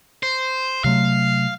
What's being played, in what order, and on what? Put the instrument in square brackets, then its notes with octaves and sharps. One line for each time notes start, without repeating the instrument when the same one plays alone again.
[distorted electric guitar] C5
[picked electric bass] C3 F#3 A3 [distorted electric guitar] F5